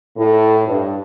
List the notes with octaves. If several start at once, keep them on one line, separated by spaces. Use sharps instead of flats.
A2
G2